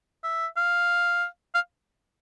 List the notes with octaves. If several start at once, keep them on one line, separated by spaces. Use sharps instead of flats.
E5
F5
F5